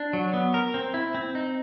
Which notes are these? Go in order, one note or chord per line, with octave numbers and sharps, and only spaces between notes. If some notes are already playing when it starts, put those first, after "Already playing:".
Already playing: D4
F#3
B3
A#4
C4
E4
C4
D#4